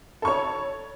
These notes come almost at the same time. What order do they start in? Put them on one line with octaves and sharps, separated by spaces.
A4 C#6 C#5